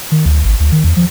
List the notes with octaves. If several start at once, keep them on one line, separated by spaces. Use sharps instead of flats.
D#3
D2
G#1
D2
D#3
E2
F3